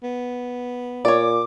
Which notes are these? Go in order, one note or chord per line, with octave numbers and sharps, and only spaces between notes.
B3
A#2 C#5 D5 D6